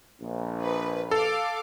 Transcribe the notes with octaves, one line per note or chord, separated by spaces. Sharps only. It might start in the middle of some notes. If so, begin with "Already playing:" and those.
A#1
B4
A4 F5 D6